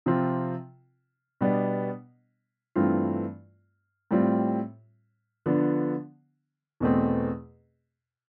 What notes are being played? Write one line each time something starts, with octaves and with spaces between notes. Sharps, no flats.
C3 F3 C4 F4
B2 G3 B3 D4
G2 E3 A3 C4 F4
A2 G3 C4 F4
D3 F3 B3 D4
E2 B2 A3 C4